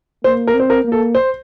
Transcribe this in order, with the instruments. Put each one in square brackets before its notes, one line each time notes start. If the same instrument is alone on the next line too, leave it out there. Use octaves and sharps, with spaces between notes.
[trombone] A#3 [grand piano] C5
[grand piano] A#4
[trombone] C4
[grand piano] C5
A#4
[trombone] A#3
[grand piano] A4
C5